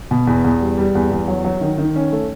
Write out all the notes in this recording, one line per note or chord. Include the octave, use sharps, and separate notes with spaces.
B2
E2
E2
G3
G3
E2
E2
F#3
F#3
D#3
D#3
C#4
A3